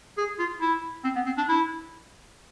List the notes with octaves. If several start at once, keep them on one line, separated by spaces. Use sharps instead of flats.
G#4
F4
E4
C4
B3
C4
D4
E4